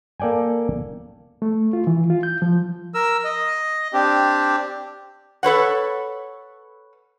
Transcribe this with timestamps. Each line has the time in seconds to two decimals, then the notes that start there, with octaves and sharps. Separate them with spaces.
0.20 A#3 A4 D5 G5 G#5
1.42 A3
1.73 F4
1.87 E3
2.10 F4
2.23 G6
2.42 F3
2.94 A#4 E6
3.24 D#5
3.93 C4 D4 G4
5.43 A4 B4 C#5 F#5